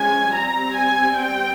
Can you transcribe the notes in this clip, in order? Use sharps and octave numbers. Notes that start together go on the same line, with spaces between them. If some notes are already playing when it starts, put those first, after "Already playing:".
Already playing: F3 G#3 C#4 G#5
G3 C4 A#5
G#5
G5